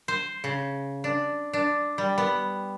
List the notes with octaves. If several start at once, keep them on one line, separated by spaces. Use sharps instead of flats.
C5
C#3
D4
D4
G3
B3